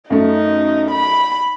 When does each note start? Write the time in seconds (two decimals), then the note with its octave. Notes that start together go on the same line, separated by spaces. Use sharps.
0.10 F#2 A3 D#4
0.91 B5